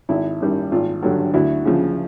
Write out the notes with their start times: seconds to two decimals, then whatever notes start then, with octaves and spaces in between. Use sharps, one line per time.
0.09 G#1 E4
0.41 F#2 D#3 G3
0.72 G#1 F4
1.02 G2 D3 F#3
1.34 D2 E4 F#4
1.66 C#3 F3